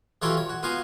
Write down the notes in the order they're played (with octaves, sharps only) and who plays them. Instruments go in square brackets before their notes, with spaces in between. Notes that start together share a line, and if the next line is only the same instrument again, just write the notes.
[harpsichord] E3 F#3 F4 G4 A4 C#5
C#5
F#4
B3 F4 F#4 F5 G#5